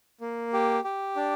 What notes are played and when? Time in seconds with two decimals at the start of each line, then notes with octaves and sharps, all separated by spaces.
0.21 A#3
0.53 G4
0.84 G4
1.16 D4